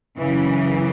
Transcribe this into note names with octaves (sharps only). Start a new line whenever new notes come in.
F#2 C#3 E3